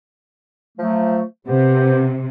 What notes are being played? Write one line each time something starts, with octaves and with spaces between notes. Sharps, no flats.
F3 F#3 A3
C3 B3 G4 C5